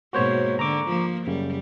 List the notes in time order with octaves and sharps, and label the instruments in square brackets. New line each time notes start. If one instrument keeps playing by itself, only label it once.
[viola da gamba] G#2 B2 A#3 [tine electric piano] F#4 C5 C#5
[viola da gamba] D3 [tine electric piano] A#5 C#6 D6
[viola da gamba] F3 A#3
[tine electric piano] F#2 C#3 [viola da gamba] G3